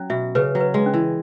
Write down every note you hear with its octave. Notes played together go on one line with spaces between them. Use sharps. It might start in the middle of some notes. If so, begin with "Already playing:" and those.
Already playing: F#3 C#4
B2 E5
C#3 B4
F#3
B4
G#3
C#4
E3